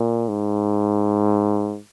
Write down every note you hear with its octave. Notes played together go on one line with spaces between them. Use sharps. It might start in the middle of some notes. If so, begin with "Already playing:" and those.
Already playing: A#2
G#2